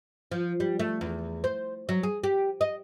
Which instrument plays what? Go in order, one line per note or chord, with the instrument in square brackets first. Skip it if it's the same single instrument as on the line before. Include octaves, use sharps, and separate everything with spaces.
[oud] F3
G3
A3
E2
C5
F#3
G#4
G4
D#5